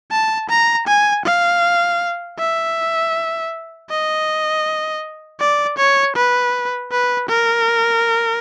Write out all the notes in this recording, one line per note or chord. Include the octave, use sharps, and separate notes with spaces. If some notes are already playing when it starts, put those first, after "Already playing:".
A5
A#5
G#5
F5
E5
D#5
D5
C#5
B4
B4
A#4